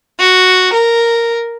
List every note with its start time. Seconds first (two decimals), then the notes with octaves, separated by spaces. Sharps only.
0.20 F#4
0.74 A#4